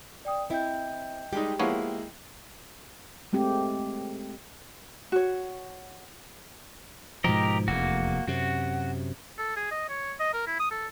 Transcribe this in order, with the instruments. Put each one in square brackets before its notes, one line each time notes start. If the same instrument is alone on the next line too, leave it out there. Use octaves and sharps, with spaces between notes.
[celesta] D5 G5 D#6
[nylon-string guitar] C4 E4 [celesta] D#5 G5 G6
[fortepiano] G3 G#3 D#4 [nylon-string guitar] G4
[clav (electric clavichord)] F3 B3 C#5 [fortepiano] G#3 A#3 E4
[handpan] G#3 A3 C4 G4
[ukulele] F#4 C#5
[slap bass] G#2 B2 F3 [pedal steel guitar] G4 A#4 D#5
[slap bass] F1 E2 [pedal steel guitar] A#3 F#4
[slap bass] F#2 C3 [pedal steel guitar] F#4
[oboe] A4
G#4
D#5
C#5
D#5
A#4
E4
D#6
A4